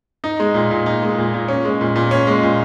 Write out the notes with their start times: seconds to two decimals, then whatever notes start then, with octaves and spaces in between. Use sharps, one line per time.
0.24 D#4
0.40 G#3
0.54 A#2
0.71 A#2
0.86 D#4
1.03 G#3
1.18 A#2
1.34 A#2
1.48 C#4
1.65 G#3
1.81 A#2
1.96 A#2
2.11 C#4
2.27 G#3
2.43 A#2